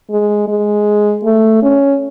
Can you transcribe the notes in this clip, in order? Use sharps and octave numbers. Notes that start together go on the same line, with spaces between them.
G#3
G#3
A3
C#4